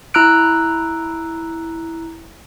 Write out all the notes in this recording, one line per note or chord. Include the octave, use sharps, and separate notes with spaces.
E4 A#5 E6 F#6 D7